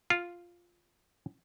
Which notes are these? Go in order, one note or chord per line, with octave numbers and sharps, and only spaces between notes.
F4